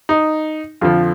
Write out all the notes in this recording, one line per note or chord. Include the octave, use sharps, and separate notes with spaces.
D#4
F2 D3 F3 F4